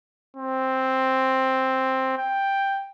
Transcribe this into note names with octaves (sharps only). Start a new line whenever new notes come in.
C4
G5